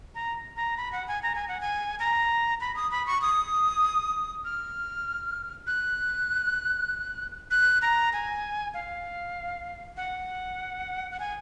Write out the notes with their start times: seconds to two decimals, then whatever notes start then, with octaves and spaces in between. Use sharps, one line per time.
0.15 A#5
0.57 A#5
0.77 B5
0.92 F#5
1.08 G#5
1.23 A#5
1.35 G#5
1.48 F#5
1.61 G#5
1.99 A#5
2.61 B5
2.76 D#6
2.91 B5
3.07 C#6
3.22 D#6
4.45 F6
5.67 F#6
7.51 F#6
7.82 A#5
8.13 G#5
8.74 F5
9.97 F#5
11.11 F#5
11.19 G#5